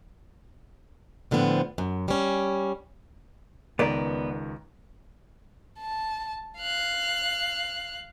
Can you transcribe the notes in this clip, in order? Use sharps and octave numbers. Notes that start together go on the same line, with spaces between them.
A2 D3 F3 B3 C4
F#2
G3 C#4
C#2 D#3 B3 D5 A#5
A5
F5 F#6